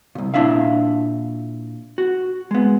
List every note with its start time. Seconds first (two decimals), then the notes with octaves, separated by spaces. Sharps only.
0.15 C2 A#2
0.34 A#2 E3 D4 E4 E5 F5
1.98 F#4
2.51 G#3 B3